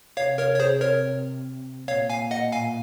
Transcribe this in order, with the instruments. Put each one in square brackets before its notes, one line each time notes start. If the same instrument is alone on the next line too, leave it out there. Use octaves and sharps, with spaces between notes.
[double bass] C3 [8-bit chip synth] C#5 F5
[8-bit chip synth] A#4 C#5
C#5
G#4 C5
A#4 C#5
[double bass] A#2 [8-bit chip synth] C#5 F5
[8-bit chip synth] F5 G#5
D#5 F#5
F5 G#5